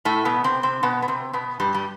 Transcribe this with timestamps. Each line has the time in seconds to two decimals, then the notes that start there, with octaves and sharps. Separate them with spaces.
0.05 A2 A3
0.25 B2 B3
0.44 C3 C4
0.63 C3 C4
0.83 B2 B3
1.02 B3
1.08 C3 C4
1.33 B2 B3
1.60 G2 G3
1.74 G3